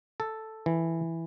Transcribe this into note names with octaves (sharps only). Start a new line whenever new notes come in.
A4
E3